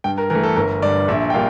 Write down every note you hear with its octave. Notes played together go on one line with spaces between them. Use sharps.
G2 G5
A#4
E3 A3 A#4
A4
G1 A#4
G2 D3 D5
A#1 E5
G5
A#2 G3 A#3 F5